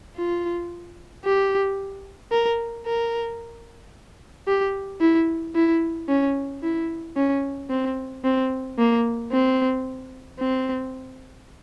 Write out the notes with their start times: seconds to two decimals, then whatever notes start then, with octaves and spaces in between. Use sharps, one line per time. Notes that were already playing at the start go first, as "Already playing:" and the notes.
0.17 F4
1.25 G4
2.32 A#4
2.86 A#4
4.47 G4
5.01 E4
5.55 E4
6.09 C#4
6.62 E4
7.16 C#4
7.70 C4
8.24 C4
8.79 A#3
9.32 C4
10.39 C4